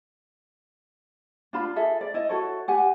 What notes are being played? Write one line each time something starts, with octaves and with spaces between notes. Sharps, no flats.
D4 F4 B5
G#4 A4 E5
D5
E4 D#5
E4 F#4 A4 C#5
G4 F#5 G#5